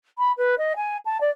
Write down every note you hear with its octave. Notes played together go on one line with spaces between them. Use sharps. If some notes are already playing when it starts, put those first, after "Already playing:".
B5
B4
D#5
G#5
A5
D5